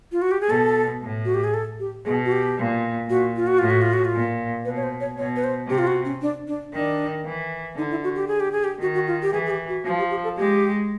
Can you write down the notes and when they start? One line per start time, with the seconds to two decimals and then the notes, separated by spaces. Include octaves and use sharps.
0.12 F4
0.22 F#4
0.31 G4
0.41 G#4
0.50 B2 A4
1.02 A2
1.25 F#4
1.34 G4
1.44 G#4
1.54 A4
1.80 G4
2.05 B2 G#4
2.25 F#4
2.32 G4
2.58 A#2
3.10 A#2 F#4
3.36 F4
3.47 F#4
3.59 A2 F4
3.70 F#4
3.82 F4
3.93 F#4
4.05 F4
4.13 A#2
4.65 B2 B4
4.76 C#5
4.83 C5
5.00 C#5
5.17 B2 C#5
5.36 B4
5.44 C5
5.69 C3 G4
5.78 F4
5.87 F#4
6.05 C#4
6.22 D4
6.47 D4
6.74 D#3 D4
7.26 E3
7.78 D3 D#4
7.91 E4
8.04 F#4
8.16 G4
8.28 G#4
8.40 G4
8.52 G#4
8.64 G4
8.81 D#3 F#4
8.95 F#4
9.07 F4
9.22 G4
9.33 E3 G#4
9.46 G#4
9.51 G4
9.68 F#4
9.86 F3 F#4
9.99 G4
10.11 G4
10.24 A4
10.37 G#3 G4